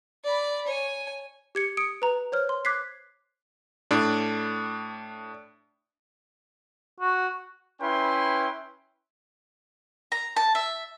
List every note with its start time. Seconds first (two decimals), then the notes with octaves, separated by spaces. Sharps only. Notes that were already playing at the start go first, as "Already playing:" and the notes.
0.24 D5 B5
0.67 C#5 G#5
1.55 G4 G#6 C#7
1.77 D#6 C#7 D7
2.02 B4 A#5
2.32 C5 C#5 F6
2.49 C6
2.65 D6 F#6 G#6 B6 C7
3.91 A2 D4
7.00 F#4
7.81 C#4 E4 B4 G5 C6
10.12 A#5
10.37 A5
10.55 E5